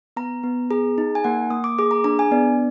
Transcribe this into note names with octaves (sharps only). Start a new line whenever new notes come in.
B3 A#5
B3
G#4 A#5
D#4
G#5
A#3 F#5
A#3 D#6
D6
G#4 D6
A#5
D4 A#5
G#5
B3 D5